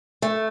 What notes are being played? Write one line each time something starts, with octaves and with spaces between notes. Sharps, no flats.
A3